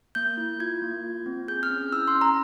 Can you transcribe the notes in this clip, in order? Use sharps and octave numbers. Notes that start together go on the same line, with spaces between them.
A#3 G6
E4
F4 G#6
A#3
F4
C4
G#4 G6
F6
C#4
E4 E6
C6
C#4
A#5